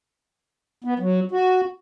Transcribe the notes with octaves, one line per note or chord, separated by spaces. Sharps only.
B3
F#3
F#4